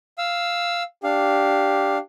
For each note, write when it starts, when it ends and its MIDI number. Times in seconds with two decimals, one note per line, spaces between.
0.18 0.83 77
0.18 0.83 88
1.04 1.98 62
1.04 2.01 67
1.04 1.98 77